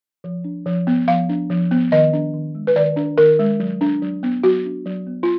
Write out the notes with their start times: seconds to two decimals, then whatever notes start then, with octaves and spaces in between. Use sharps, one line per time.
0.24 F3
0.44 D4
0.66 F3
0.87 B3
1.08 F3 F5
1.29 D4
1.50 F3
1.71 B3
1.92 D#3 D#5
2.13 D4
2.34 D#3
2.55 G#3
2.67 B4
2.76 D#3 D5
2.96 D4
3.18 D#3 A#4
3.39 G#3
3.60 F#3
3.81 D4
4.02 F#3
4.23 B3
4.43 F#3 F#4
4.65 D4
4.86 F#3
5.07 B3
5.23 F4